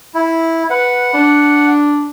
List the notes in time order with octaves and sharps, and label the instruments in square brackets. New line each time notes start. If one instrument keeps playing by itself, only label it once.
[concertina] E4
[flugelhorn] B4 [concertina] F#5
[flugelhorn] D4